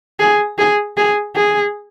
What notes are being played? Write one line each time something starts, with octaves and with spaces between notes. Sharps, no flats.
G#4
G#4
G#4
G#4